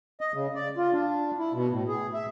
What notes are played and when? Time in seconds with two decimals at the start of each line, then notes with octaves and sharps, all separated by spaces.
0.21 D#5
0.34 C#3
0.55 D5
0.77 F4
0.93 D4
1.39 E4
1.53 B2
1.71 A2
1.88 G#4
2.14 E5